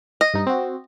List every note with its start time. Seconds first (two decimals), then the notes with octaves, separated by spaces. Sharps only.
0.21 D#5
0.34 G2 D#4
0.47 C4 F#4